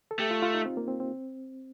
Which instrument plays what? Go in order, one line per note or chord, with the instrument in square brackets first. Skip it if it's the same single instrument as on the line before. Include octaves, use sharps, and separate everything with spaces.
[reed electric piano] A4
[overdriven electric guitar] A3 [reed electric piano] G4
[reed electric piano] F4
F4
D#4
C4
A#3
C4
C4